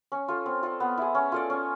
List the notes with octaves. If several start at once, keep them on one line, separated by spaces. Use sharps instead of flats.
C#4
F4 A4
C4
F4 A4 D5
B3
E4 G#4
C#4
F4 A4 D5
C#4